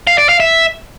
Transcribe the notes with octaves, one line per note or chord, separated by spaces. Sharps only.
F5
D5
F5
E5